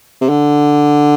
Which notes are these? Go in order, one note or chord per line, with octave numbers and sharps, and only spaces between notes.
C3
D3